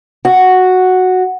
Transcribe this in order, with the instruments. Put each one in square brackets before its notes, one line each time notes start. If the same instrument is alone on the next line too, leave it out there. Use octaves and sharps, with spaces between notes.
[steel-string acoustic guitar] F#4